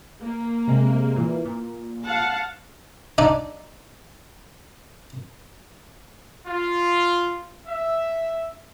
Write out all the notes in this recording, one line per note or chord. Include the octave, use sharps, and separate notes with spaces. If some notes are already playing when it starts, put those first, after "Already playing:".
A#3
C3 G#3
A#2 E3
A#2
F5 F#5 A5
D4 D#4
F4
E5